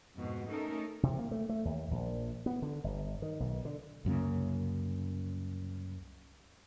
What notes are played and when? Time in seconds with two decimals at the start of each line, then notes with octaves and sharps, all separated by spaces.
0.15 F2 G#2 B2
0.50 A3 C#4 D#4 A4 A#4
1.03 C3
1.19 A#3
1.31 A3
1.49 A3
1.65 D#2
1.91 A#1
2.46 B3
2.62 D3
2.84 G1
3.22 D#3
3.40 B1
3.65 D3
4.05 C2 F#2 C#3 A#3